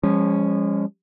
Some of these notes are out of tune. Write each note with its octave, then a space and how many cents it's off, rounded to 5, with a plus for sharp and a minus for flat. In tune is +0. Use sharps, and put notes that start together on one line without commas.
F3 +0 G#3 -30 C#4 +0